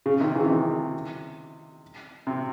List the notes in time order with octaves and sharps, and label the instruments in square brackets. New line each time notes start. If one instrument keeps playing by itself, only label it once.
[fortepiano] C#3
C3 D#3
C#3 E3
C3 D#3
C3